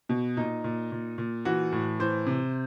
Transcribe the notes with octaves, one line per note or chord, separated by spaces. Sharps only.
B2
A#2 D#4
A#2
A#2
A#2
E3 F#4
A2
E3 C5
C3